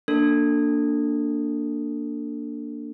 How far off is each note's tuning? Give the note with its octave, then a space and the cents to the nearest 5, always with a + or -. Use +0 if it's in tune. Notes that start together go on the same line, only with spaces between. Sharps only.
A#3 +0 D4 +0 A4 +25